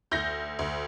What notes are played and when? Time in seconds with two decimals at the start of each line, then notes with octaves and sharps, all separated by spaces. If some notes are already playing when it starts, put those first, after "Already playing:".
0.11 D2 G6 A#6
0.59 D2